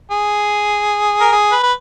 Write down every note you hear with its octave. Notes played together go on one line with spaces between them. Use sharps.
G#4
A#4
G#4
B4
B4